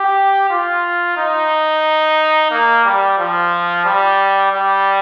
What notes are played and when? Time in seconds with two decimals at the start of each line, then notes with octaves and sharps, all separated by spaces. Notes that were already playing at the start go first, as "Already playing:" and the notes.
Already playing: G4
0.50 F4
1.17 D#4
2.51 A#3
2.85 G3
3.18 F3
3.85 G3
4.53 G3